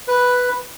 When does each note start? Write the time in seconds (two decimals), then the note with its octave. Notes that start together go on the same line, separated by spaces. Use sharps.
0.08 B4